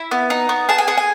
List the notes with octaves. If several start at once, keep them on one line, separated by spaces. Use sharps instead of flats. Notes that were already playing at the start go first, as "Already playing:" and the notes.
Already playing: E4 B5
B3
D#4
B3
G#4 A5
G#5
G#4 F#5
G#5